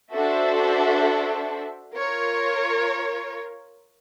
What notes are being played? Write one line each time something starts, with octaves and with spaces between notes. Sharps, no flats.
D4 F#4 A4 C5 E5
F4 A#4 C#5